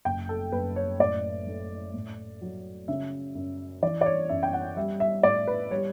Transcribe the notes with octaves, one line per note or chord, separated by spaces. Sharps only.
F#1 G5
A4
F#1 B4
C#5
A2 D5
A3
A2
F#3
C#3 E5
F#2
E3 D5
D5
C#5
F#2 E5
G5
F#5
G3 E5
E5
A2 D5
B4
G3 C#5